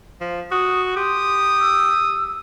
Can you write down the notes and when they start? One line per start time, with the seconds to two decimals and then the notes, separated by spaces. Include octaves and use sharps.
0.21 F3
0.51 F#4 D#6
0.97 G4 C6 D#6
1.61 E6